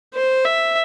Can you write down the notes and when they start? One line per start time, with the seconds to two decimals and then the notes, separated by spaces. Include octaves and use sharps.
0.14 C5
0.45 E5